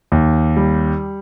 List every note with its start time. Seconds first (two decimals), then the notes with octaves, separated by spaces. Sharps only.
0.12 D#2
0.57 G3